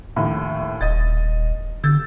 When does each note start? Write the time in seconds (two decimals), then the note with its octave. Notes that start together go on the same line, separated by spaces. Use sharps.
0.16 A#1 D#2 A2
0.81 D#1 D#5 A6
1.84 D3 E6 G6 A6